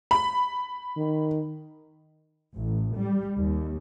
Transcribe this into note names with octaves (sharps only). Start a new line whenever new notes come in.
B5
D#3
A1
G3
D#2